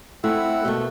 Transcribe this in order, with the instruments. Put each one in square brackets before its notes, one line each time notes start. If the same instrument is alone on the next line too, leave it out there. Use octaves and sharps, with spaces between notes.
[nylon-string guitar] A3 [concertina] C4 F#5 E6 [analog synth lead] E4
[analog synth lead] B2 [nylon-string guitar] A3 A#3 G4